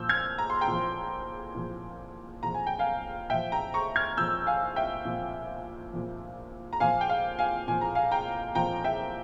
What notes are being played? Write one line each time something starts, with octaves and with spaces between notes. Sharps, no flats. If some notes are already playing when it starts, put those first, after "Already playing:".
Already playing: A#2 F3 E6 G6
F6 G#6
A#5
C6
G5 A#5
A#2 F3
A#2 F3
A#2 F3 A#5
G#5
G5
F5 G#5
A#2 F3 E5 G5
G5 A#5
A#5 C#6
F6 G#6
A#2 F3 E6 G6
F5 G#5
E5 G5
A#2 F3
A#2 F3
A#5
A#2 F3 F5 G#5
G5
F5
F5 G#5
A#2 F3 G#5
A#5
F5 G#5
G5 A#5
A#2 F3 G5 A#5
E5 G5